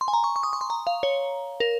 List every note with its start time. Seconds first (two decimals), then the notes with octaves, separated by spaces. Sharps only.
0.01 C6
0.08 G#5
0.13 A#5
0.24 C#6
0.36 C#6
0.43 D#6
0.53 C#6
0.61 C6
0.70 A#5
0.87 F5
1.03 C#5
1.60 A#4